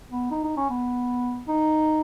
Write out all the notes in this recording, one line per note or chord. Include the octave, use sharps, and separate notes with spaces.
B3
D#4
D#4
C#4
B3
D#4